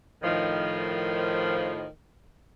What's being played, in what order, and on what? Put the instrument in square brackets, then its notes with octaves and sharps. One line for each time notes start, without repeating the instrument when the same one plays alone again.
[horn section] A2 D#3 F3